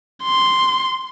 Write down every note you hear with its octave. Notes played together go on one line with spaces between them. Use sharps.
C6